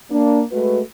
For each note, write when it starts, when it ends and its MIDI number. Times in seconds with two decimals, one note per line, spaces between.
0.11 0.41 58
0.11 0.41 62
0.52 0.80 56
0.52 0.80 57
0.52 0.80 66
0.52 0.80 71